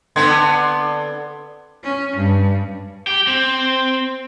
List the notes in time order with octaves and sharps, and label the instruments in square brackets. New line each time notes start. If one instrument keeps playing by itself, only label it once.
[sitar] D3 B3 C4 [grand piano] C6 G#6
[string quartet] C#4
G2
[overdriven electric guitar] G4
C4